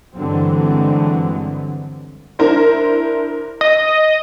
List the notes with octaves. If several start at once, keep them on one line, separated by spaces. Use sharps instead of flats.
G2 D3 E3 F#3 G#3 C4
D4 E4 A#4 C5
D#5